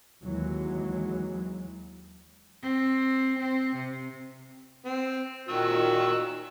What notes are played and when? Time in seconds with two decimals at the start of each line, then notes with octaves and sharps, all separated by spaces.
0.24 D#2 E3 F#3 G#3
2.63 C4
3.39 C4
3.76 C3
4.86 C4
5.49 A#2 D#3 F#4 E6